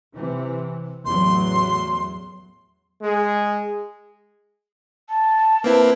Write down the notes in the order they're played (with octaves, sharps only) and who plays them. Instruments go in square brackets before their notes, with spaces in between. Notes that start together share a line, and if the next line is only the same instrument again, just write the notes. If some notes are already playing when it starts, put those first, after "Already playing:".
[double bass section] C3 E3
[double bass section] A1 E2 F#3 [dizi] C6
[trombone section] G#3 G#4
[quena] A5
[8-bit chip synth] A#3 C4 E4 [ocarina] B4